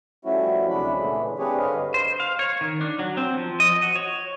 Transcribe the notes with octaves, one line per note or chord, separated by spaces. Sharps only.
F3 G3 A3 C#4 E4 F#4
D2 C3 F#3 G#3 D4 B5
A#2 C#3 E3 G#3 A3
C4 D4 G4 G#4 B4 C#5
G2 D3 B4 C#5 D#5 F5
C5
F5
C#5
D#3
D4
F#3
C4
F3
D#5
F#4
C#5